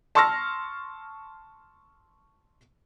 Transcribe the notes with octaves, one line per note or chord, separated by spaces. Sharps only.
A5 C6 C#6 E6 F6 A#6